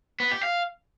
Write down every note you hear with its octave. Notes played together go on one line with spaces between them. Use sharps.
B3
G4
F5